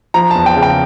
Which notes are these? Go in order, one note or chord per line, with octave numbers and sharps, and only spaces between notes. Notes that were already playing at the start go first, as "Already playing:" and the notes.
F3 A#5
E2 A5
G5
C#3
G5